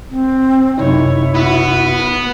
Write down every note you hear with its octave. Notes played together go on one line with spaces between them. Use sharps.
C4
F#2 C3 D#4 E4 C#5
B3 F#4
B4